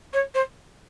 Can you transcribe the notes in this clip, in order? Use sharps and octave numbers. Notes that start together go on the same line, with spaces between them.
C#5
C5